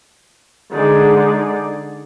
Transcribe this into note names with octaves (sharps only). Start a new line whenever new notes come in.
D3 G#3 D#4 G#4 D5